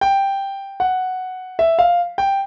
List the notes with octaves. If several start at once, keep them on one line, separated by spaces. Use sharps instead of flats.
G5
F#5
E5
F5
G5